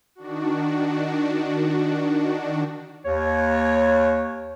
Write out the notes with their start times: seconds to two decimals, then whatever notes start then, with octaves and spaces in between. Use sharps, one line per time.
0.15 D#3 D4 F#4
3.05 D#2 C#5